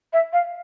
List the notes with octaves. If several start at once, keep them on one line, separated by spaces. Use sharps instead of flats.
E5
F5